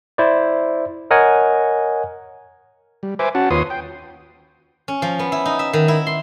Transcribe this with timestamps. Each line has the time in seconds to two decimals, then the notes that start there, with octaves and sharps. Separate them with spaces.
0.18 E4 C5 D5
1.11 A#4 C#5 D#5 F#5 G#5
3.03 G3
3.19 B4 C5 E5 G#5 D6
3.35 C#4 F#4 F#5 A5
3.50 D#2 F4 B4 C#5 C6 D#6
3.70 G5
4.88 C#4
5.02 F3
5.19 B3
5.32 E4
5.45 D#4
5.59 E5
5.73 D#3
5.88 E4
6.07 C6